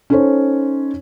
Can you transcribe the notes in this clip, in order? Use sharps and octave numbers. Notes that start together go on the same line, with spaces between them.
C#4 D#4 A4 C5 C#5